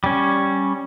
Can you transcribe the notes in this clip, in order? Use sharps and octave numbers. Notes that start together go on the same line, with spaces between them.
G3 C#4